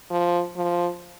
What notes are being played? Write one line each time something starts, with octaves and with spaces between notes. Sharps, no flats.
F3
F3